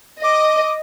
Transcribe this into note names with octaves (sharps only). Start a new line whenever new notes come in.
D#5 D6